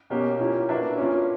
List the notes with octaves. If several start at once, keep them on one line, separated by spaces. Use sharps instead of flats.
B2 A#3 C#4 G4
A#2 A#3 C#4 E4 G4
A#3 D4 F#4 B4 E5
A#2 A#3 C#4